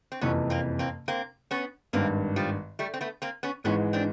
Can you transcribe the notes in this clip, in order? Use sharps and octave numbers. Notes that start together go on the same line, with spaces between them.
C4
F#1 F2 C3 E3 B3 C#4
A#3 C4
A#3 C4
A#3 C4
B3 C#4
G#1 G2 D#3 A#3 C4
F3 G3
G3 A3
C4
A3 B3
A#3 C4
B3 C#4
G#1 G#2 E3 G#3 B3 C#4
C4 D4